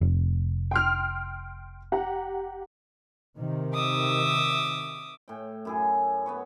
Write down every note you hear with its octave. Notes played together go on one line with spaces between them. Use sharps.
F1
G5 C6 F6
G4 F#5 A#5
C3 D#3
E5 D6 D#6
A2 G5
F#2 E4 G#4
B3 B4 C#5